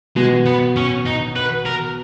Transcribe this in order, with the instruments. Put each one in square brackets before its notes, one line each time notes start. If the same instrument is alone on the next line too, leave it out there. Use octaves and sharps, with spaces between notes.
[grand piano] B2 [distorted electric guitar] G#3
[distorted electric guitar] B3
C#4
D#4
B4
A#4